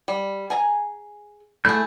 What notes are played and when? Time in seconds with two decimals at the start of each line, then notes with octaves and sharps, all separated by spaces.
0.08 G3
0.50 G#4 G#5 A#5
1.65 A3 E4 G#4 G6